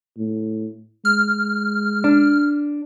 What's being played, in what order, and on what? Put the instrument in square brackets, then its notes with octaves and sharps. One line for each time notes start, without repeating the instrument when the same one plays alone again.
[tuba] A2
[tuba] G#3 [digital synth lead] F6
[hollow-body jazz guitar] D4